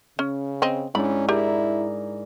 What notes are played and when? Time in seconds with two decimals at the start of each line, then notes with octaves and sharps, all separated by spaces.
0.19 C#3 C#4
0.62 C4 D#5
0.95 G#2 C#4 D4 E4 B5
1.29 E4 G4 G#4 A#4 D5